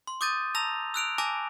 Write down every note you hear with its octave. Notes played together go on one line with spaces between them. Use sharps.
C6
D6 D#6 G6 A6 D#7
A5 A#5 E6 A#6 F7
E6 F#6 D7 F7
G#5 A5 D6 E6 A#6